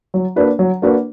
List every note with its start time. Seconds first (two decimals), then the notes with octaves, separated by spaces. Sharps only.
0.14 F#3
0.36 A#3 D4 F#4 B4
0.59 F#3
0.82 A#3 D4 F#4 B4